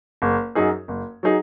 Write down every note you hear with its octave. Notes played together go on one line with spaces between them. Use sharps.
F#1
F#2 F#3 D#4 G#4
F#1
F#3 D#4 G#4